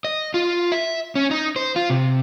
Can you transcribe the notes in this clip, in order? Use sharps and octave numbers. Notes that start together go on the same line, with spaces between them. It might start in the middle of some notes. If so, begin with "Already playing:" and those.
D#5
F4
E5
C#4
D#4
C5
F4
C3